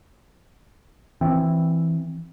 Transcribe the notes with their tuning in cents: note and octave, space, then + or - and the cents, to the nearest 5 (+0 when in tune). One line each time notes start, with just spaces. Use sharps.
E3 +0 C4 +5